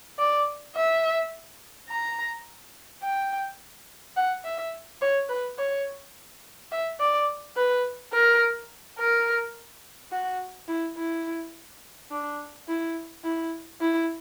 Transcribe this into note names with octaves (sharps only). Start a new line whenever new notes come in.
D5
E5
A#5
G5
F#5
E5
C#5
B4
C#5
E5
D5
B4
A#4
A#4
F#4
E4
E4
D4
E4
E4
E4